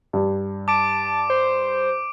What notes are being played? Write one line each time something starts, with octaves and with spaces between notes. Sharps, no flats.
G2
A5 D6 D7
C5